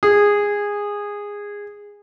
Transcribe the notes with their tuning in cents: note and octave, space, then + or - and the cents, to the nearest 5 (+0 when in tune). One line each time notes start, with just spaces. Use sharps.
G#4 -15